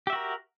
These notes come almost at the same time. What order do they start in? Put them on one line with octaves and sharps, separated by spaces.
G4 E5 F#4 A#4